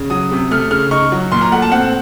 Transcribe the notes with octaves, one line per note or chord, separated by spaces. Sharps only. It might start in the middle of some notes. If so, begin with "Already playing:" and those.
Already playing: C#3
F#3 D#6
C3
A3 F6
C#3 F6
D#4 C#6
F#3
A#2 C6
A#5
A3 F#5
A5
C4 F#5